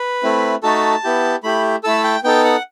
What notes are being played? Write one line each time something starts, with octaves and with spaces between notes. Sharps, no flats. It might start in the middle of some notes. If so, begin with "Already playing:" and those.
Already playing: B4
A3 C4 E4
A3 D#4 F#4 A4 A5
B3 E4 G4
A3 E4 G4 B5
A3 E4 A4 E6
G5
B3 D#4 A4 G5
F#5